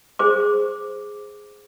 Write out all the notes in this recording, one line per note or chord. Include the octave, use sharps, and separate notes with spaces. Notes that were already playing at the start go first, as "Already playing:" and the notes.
G#4 C5 D6